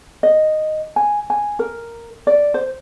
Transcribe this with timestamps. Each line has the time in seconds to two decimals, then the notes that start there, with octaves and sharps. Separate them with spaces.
0.23 D#5
0.96 G#5
1.30 G#5
1.59 A#4
2.27 D5
2.54 C5